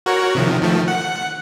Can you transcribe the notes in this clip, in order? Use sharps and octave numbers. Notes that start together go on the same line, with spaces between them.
F#4 A#4 C#5
C3 D#3 F3
D#3 F3 A3
F#5